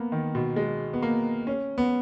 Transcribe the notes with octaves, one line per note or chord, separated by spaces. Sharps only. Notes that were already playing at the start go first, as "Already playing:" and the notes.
Already playing: A#3 B3
D#3
B2
G#3
B3
A#3
C#4
B3